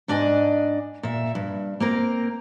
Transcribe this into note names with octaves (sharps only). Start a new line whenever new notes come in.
G#2 D4 D5 D#5 G#5
A#2 E5
G2
A#3 C4 A#4